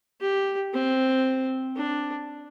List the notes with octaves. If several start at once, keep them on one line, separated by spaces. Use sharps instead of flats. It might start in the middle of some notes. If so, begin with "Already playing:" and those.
G4
C4
D4